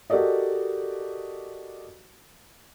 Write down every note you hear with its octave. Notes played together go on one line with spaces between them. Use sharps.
F#4 G4 A4 A#4 D5 D#5